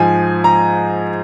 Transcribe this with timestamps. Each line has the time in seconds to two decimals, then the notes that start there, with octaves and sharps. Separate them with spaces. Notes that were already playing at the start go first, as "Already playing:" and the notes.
Already playing: G#2 F3 G#5
0.44 A#5